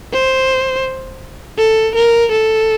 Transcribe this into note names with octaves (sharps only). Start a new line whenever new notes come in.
C5
A4
A#4
A4